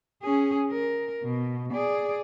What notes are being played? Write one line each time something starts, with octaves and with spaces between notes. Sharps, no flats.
C#4 G#4
A#4
B2
G#4 D5